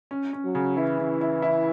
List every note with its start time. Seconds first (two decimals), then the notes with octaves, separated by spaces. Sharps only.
0.11 C#4
0.33 C#4
0.45 F#3
0.55 C#3
0.77 E3 E4
0.98 C#3
1.21 E4
1.42 E4